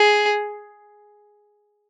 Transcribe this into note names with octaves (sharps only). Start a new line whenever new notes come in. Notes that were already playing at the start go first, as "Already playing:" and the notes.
Already playing: G#4